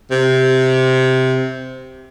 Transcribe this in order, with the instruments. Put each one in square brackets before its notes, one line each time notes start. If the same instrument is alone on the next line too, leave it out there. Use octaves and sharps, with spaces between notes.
[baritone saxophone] C3